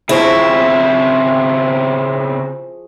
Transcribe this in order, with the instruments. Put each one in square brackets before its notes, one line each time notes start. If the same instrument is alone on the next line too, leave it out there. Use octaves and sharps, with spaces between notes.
[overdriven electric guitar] C#3 C4 [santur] F3 G#4 C#6 [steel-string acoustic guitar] E4